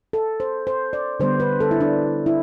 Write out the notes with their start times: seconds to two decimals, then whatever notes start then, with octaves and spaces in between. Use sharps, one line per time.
0.13 A4
0.40 C5
0.67 C5
0.93 D5
1.20 D3 G3 B3 C5
1.40 B4
1.60 A4
1.71 E4
1.81 D4
2.26 E4